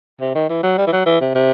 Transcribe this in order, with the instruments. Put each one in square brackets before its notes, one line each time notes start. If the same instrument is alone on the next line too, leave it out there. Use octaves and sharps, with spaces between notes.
[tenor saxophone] C3
D#3
E3
F#3
G3
E3
F#3
E3
C3
C3